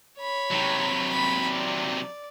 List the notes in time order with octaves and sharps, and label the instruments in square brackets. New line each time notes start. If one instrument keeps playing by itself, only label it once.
[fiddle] C#5 B5
[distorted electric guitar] C3 F#3
[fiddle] B5
D5